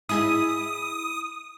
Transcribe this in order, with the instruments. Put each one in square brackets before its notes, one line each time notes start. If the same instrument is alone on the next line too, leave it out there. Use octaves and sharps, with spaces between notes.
[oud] E4 G#4 D#5 [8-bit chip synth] D#6